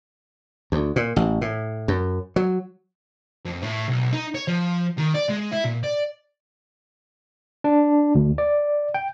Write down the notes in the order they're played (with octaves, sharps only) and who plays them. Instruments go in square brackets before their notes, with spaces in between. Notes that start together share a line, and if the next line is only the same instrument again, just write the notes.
[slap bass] D2
A#2
A1
A2
F#2
F#3
[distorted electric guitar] F2
A2
B1
D#4
C#5
F3
D#3
D5
G#3
E4
A#2
D5
[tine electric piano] D4
D2
D5
G5